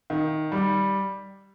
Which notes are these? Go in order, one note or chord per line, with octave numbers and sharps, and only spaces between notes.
D#3
G3